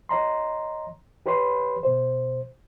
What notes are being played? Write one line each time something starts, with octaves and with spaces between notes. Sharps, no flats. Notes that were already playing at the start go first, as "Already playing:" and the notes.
C#5 D#5 A#5 C6
G4 B4 C#5 B5 C6
B2 C5